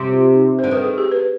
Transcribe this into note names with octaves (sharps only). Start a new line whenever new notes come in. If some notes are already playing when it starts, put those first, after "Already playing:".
Already playing: C3
F4
D#4
C5
D3
D#3 B4
G#4
G4
B4